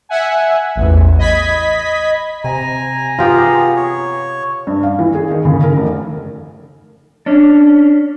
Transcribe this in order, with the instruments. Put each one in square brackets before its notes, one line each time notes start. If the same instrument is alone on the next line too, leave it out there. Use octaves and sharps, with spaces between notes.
[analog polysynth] E5 F#5 G#5
A1 E2
D#5 B5 G#6 B6
[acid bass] C3 [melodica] G#5 [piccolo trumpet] A#5
[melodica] B3 G#4 [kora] F4 G4
[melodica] C#5
[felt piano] G2
F5
E3
G#4
D#3
C#3
A#4
F1
[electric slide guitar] C#4 D4